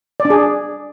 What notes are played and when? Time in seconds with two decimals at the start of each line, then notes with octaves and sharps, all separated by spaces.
0.20 D5
0.25 D4
0.30 G#4